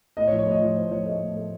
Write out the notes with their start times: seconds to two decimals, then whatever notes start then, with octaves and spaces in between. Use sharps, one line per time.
0.17 A2 D#5
0.28 C#5
0.33 F3
0.39 C#5
0.46 A2 D#5
0.62 F3 C#5
0.76 A2 C5
0.91 F3 C#5
1.06 A3 D#5
1.21 A2
1.36 A3